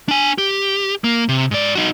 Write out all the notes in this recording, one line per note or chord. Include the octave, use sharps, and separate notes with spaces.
D4 G#5
G4
A#3
C3
G#2 D5
D#4 F#4